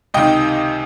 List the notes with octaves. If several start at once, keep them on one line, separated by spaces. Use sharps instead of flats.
C#2 C3 D#3 D#5 G5